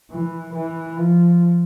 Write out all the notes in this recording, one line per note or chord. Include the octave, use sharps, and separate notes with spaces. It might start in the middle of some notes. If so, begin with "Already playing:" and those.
E3
E3
F3